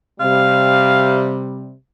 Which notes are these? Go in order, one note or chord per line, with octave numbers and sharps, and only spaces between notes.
C3 G3 F5